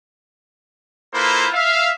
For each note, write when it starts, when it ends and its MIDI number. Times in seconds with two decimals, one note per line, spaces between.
1.13 1.48 58
1.13 1.48 64
1.13 1.48 65
1.13 1.48 69
1.13 1.48 71
1.13 1.48 72
1.53 1.91 76
1.53 1.91 77